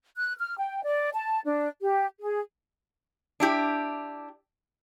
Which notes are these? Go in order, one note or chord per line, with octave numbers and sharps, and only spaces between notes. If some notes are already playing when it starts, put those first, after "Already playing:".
F#6
F6
G5
D5
A5
D4
G4
G#4
D4 E4 G4